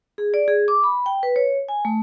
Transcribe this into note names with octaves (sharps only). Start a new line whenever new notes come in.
G#4
D5
G#4
D6
B5
G5
B4
C#5
G#5
A3